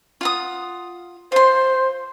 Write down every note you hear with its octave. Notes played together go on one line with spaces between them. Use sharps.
F4 F#5 D#6
F4 C5 C6